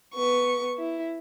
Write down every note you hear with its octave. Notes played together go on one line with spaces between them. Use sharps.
B3 C#6
E4